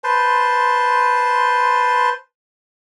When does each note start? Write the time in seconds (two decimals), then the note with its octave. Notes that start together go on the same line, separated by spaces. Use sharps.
0.04 B4 C5 A5 C6